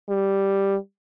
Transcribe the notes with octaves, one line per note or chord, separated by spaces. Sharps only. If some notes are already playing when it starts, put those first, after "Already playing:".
G3